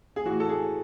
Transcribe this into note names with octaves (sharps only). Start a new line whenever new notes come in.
G#4
A2 E3 F#4
A4
G#4